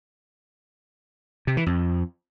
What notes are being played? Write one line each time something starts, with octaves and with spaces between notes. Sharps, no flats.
C3
E3
F2